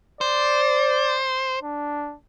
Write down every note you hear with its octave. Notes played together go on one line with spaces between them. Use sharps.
C5 D5
D4